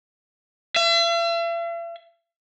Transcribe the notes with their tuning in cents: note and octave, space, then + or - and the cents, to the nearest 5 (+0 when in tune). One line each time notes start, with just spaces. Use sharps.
E5 +45